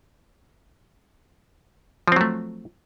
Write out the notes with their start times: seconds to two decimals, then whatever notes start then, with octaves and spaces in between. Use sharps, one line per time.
2.08 F3
2.12 C4
2.16 F#3
2.21 A3